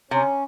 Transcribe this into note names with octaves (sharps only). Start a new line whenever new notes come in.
C3 C#4